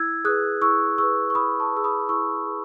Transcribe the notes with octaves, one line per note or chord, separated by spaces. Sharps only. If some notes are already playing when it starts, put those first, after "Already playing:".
Already playing: E4 E6 G#6
G#4 B4 D#6 F#6
E4 C#6 E6
G#4 B4 C#6 E6
C#6
E4 B5 D#6
A5 C#6
G#4 B4 E6
B5 D#6
E4 C#6 E6
G#4 B4